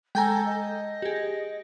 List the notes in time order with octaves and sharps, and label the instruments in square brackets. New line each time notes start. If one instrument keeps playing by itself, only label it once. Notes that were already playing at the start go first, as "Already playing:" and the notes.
[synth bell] G#3 G6 [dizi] A4 [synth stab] G5 G#5 A#5
[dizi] D#5
[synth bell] G4 G#4